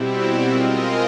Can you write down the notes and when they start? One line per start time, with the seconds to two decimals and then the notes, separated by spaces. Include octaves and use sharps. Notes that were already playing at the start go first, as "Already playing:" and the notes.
Already playing: B2 G3 C4 E4
0.49 G#3 C4 F4 A#4 D#5